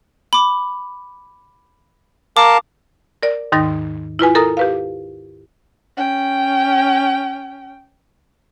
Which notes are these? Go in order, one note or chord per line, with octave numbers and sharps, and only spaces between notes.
B5 D6
A#4 F5 A5 D6
A#4 D5
D#2 G#2 D#3 D#4 A6 A#6
E4 F4 B4 G#5
A4 A#4 A#5 D#6
G4 B4 F5
C#4 G5